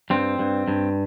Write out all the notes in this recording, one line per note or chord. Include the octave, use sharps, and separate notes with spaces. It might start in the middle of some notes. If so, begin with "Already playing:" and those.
G2 C4
G2
G2